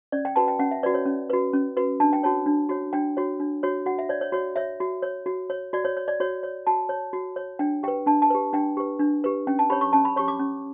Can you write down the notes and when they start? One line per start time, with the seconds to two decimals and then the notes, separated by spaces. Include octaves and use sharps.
0.12 C#4 D5
0.25 G5
0.36 F#4 B4 A5
0.48 G5
0.59 C#4 F#5
0.71 E5
0.83 F#4 B4 D5
0.94 C#5
1.06 C#4
1.30 F#4 B4
1.53 C#4
1.77 F#4 B4
2.00 D4 A5
2.13 G5
2.23 F#4 C#5 A5
2.46 D4
2.69 F#4 C#5
2.93 D4 G5
3.17 F#4 C#5
3.40 D4
3.63 F#4 C#5
3.86 F#4 F#5
3.99 E5
4.09 C#5 D5
4.21 C#5
4.32 F#4 C#5
4.56 C#5 E5
4.80 F#4
5.02 C#5
5.26 F#4
5.50 C#5
5.73 F#4 D5
5.85 C#5
5.97 C#5
6.08 D5
6.20 F#4 C#5
6.43 C#5
6.67 F#4 A5
6.89 C#5
7.13 F#4
7.36 C#5
7.59 D4 G5
7.83 G4 B4 G5
8.06 D4 A5
8.22 A5
8.30 G4 B4
8.53 D4 G5
8.77 G4 B4
8.99 D4
9.24 G4 B4
9.47 C#4 G5
9.59 A5
9.70 G4 C#5 B5
9.81 C#6
9.93 C#4 A5
10.05 B5
10.16 G4 C#5 C#6
10.28 D6
10.39 C#4